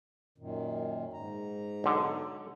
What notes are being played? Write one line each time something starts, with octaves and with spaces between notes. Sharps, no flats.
F#2 A#2 D#3
G#2 A#5
B1 D3